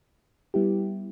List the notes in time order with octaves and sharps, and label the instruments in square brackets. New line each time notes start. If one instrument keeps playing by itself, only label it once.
[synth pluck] G3 B3 E4 G4